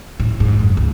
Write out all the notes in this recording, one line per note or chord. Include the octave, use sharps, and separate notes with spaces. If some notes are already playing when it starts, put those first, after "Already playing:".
A2
G#2
F#2
C#2